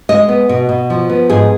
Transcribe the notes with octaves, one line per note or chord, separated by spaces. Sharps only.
G#3 D#5
B3
B2
B2
F3
B3
G#2 G#4